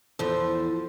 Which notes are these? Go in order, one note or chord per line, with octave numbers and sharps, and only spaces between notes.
E2 F3 A4 C5